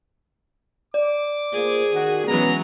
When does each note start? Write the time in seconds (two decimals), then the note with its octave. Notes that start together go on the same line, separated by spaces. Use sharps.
0.94 D5 D6
1.53 A#3 F4 G#4 C5
1.93 D#3 F#4
2.28 E3 F#3 G#3 B3 C#4 A#5